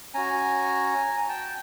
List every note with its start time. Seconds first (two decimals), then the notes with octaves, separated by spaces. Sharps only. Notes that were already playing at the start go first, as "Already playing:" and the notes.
0.14 C#4 F#4 G#5 A#5
1.28 G5 A5